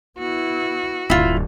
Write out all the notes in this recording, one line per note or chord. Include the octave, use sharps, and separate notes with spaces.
B3 E4 F#4
D1 G2 D3 E4 F4